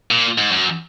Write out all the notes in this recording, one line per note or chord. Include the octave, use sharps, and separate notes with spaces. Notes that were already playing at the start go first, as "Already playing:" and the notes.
A#2
G#2
F#2